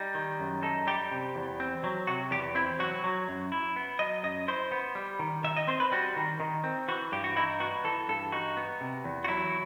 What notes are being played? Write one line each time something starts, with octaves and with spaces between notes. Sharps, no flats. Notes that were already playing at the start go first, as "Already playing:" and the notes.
Already playing: G3 D#4
D#3
F#2
D#4 A4
G3 G4
C3
E2
C4
F#3
C3 F#4
E2 G4
C4 E4
F#3 F#4
F#3
F#2
E4
B3
F#3 D#5
F#2 D#5
E4 C5
B3
G3
D#3
D#3 E5
D#5
C4 C5
B4
G3 F#4
D#3
D#3
C4
E3 F#4
G2 G4
F#4
D#4 E4
B3 F#4
E3 A4
G2 A4
D#4 F#4
B3
C3
E2
F#4
F#3 E4